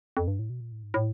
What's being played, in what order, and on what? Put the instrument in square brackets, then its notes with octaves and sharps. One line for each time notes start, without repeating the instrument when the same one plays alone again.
[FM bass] F2
G2
A2
B2
A#2
A2
G#2
A2